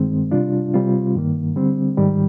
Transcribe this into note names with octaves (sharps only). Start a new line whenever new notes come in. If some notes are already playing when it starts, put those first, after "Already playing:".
Already playing: G2 D#3 G#3 C4
C3 G3 D4 F4
C3 G3 C4 F4
G2 D#3 A#3
D3 G3 C4
G#2 D#3 G3